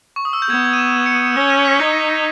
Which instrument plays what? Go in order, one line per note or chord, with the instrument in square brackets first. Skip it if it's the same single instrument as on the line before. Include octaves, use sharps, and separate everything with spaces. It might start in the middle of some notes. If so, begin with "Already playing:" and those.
[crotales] C#6
D#6
E6
G6
[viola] B3 [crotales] G#6
[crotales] G#6
D#7
E7
C#7
D#7
E7
[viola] C#4 [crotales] G7
[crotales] D#7
B6
[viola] D#4 [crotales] G#6